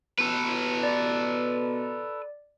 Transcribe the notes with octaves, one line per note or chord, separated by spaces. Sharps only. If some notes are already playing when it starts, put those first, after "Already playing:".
B2 A4 B4
D5